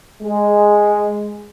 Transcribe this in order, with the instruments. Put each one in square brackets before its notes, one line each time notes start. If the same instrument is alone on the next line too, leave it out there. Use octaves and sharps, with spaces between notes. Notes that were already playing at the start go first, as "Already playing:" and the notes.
[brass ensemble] G#3